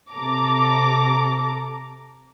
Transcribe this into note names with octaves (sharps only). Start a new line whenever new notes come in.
C3 A4 A#5 D6